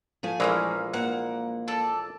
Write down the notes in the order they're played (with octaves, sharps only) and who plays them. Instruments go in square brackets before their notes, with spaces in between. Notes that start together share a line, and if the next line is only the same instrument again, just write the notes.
[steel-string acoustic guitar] F3 A3 G#5
[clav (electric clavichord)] A#1 E3 G#3 [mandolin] A#3 C4 C#4
[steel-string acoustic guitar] A#3 [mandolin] F#5
[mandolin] A4 D5